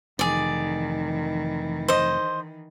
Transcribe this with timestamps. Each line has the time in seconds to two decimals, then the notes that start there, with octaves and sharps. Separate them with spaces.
0.19 F1 D#3 E3 G#4 D5
1.88 C5 D#5